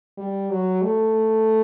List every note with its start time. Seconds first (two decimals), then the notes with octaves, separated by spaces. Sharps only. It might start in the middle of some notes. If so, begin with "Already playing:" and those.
0.18 G3
0.51 F#3
0.83 A3